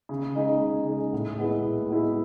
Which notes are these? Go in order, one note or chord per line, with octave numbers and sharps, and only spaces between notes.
C#3
G#3 D#4 G#4
C#3
G#3 D#4 G#4
A2
G#3 B3 E4 G#4
A2
G#3 B3 E4 G#4